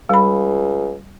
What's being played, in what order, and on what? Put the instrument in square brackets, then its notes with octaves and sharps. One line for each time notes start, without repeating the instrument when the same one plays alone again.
[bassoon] C#2 [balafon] G3 B5